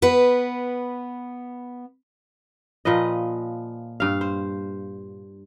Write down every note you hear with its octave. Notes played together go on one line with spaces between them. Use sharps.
B3 B4
A#2 F3 B4 D#5
G2 F5
C5